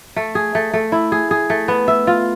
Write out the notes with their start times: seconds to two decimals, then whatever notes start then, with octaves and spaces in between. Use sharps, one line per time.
0.16 A3
0.35 G#4
0.55 A3
0.73 A3
0.92 E4
1.12 G#4
1.31 G#4
1.50 A3
1.68 B3
1.88 E5
2.07 F4